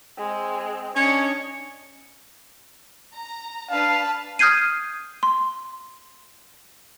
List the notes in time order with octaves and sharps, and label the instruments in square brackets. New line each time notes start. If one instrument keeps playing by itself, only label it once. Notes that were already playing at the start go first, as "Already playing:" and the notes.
[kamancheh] G#3 C4
[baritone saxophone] C#4 [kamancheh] D4 D#5 [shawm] C#5
[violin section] A#5
[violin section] D4 B4 A5 [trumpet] F5
[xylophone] D#6 F6 G6 G#6 C7 D#7
C6